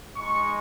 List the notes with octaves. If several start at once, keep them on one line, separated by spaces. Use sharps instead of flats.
G#3 D#4 C#6